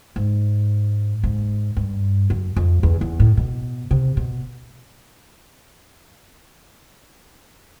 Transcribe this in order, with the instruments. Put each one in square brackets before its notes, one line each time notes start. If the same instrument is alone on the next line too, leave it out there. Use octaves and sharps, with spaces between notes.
[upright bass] G#2
G#2
G2
F#2
F2
E2
E2
A2
B2
C3
B2